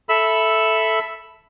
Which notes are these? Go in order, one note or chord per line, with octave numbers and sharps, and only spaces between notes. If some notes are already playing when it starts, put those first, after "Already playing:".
A4 E5 B5 E6